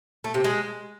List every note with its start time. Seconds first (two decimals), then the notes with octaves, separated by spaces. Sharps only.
0.24 A3
0.34 C3
0.44 G#3